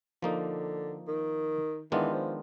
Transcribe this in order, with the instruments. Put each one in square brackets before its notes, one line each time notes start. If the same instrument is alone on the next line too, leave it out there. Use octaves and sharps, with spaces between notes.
[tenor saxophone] D3 [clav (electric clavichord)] F3 A#3 D#4
[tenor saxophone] D#3
[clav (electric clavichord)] D#3 G#3 B3 D4 F4 [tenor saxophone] E3
[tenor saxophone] F3